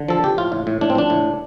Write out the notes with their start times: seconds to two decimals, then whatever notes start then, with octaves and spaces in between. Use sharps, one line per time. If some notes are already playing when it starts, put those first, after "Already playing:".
Already playing: D3
0.08 F3 A4
0.23 F3 G4
0.38 A2 F4
0.52 A2
0.67 A2
0.81 A2 D4
0.90 C4
0.95 F3 D4
1.10 A2